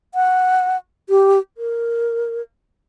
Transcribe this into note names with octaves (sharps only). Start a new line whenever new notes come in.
F#5
G4
A#4